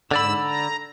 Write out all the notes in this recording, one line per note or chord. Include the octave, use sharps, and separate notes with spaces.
G#2 D3 D5 B5 E6
A#5